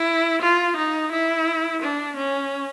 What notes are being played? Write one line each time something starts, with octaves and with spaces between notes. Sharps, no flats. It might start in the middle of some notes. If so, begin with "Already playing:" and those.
Already playing: E4
F4
D#4
E4
D4
C#4